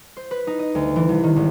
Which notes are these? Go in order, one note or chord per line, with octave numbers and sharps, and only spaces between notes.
C5
B4
D#4
D#5
D2
E3
C2
D#3
G#1